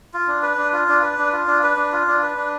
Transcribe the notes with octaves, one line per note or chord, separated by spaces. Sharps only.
F4
D4
B4
D4
F4
D4
B4
D4
F4
D4
B4
D4
F4
D4
B4
D4